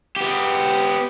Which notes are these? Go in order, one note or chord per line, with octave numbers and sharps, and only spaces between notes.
B3 G4